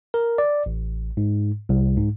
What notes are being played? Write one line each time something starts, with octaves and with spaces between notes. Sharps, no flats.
A#4
D5
A1
G#2
C2
G#2